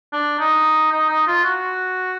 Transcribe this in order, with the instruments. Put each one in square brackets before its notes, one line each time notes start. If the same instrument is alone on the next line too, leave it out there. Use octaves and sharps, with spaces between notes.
[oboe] D4
D#4
D#4
D#4
F4
F#4